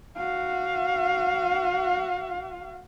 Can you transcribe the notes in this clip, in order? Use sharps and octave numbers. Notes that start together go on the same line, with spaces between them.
F#4 F5